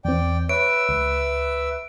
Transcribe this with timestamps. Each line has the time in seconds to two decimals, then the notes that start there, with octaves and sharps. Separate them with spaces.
0.04 E2 C4 D5 G5
0.49 B4 C#5 E5 E6 D7
0.89 C#2